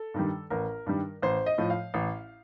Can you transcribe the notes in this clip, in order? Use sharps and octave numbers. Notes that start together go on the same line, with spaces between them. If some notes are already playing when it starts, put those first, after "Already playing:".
Already playing: A4
G2 D#3 G3
A1 A#4
G2 D#3 G3
A1 C5
D#5
A2 F3
F5
A1